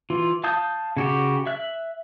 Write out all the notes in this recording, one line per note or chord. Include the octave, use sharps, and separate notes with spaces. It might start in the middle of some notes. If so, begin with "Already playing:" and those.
E3 F4
F5 A5 D#6 G6
C#3 F#4 G4
E5 F#6